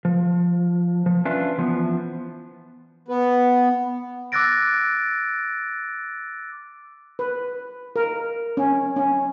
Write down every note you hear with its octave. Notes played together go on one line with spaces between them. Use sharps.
F3
F3
C#4 D4 F4 B4 E5
E3 F3 B3
B3
D6 E6 F#6 A6 A#6 D7
B4
A#4
C#4
C#4